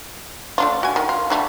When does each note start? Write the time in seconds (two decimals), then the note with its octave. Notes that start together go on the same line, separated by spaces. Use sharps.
0.58 A3 D4 F4
0.83 F#4 G#5
0.96 D#3
1.09 F4
1.30 D3 G3 A3